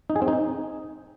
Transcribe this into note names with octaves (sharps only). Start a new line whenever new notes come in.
D#4
G#4
C4
D#4